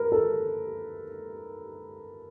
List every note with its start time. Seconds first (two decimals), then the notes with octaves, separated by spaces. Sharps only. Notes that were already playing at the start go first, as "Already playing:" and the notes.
Already playing: A#4 B4
0.12 A4